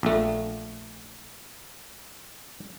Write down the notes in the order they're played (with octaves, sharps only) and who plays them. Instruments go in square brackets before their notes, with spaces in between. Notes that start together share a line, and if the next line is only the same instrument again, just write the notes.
[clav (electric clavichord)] A#1 A3